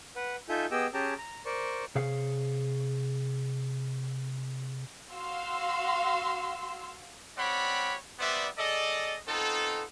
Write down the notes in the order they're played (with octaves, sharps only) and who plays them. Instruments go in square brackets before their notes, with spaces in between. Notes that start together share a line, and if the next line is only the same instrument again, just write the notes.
[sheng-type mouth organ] B4 F#5
D#4 F4 A4 E5 G#5 G6
B3 G4 G#4 D#5 G5 E6
C#4 G4 G#4 G5 A5 A#5
A#5
A#4 C5 D5 C#6
[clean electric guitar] C3 G#4 C#5 F5
[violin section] F#4 F5 C6 E6
[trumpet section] G3 C4 C#5 D5 F#5 B5
G3 B3 B4 C5 D5 E5
G#4 A4 D5 D#5
B3 C4 D#4 F4 A4